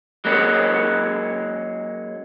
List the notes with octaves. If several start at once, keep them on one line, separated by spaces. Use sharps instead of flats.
F#3 G#3 A#3 C#4